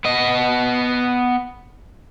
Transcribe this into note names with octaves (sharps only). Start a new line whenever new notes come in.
B3 D#5